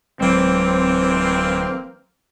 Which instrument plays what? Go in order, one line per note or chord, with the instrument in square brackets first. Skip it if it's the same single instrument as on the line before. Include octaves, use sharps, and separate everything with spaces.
[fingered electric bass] D1 F#3 G#3 [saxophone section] E3 A#3 C4